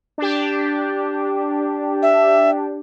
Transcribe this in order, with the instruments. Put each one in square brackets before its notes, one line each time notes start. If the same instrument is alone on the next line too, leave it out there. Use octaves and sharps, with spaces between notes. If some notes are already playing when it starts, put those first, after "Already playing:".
[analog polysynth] D4 G4
[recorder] E5